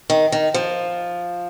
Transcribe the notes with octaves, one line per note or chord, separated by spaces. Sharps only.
D#3
D#3
F3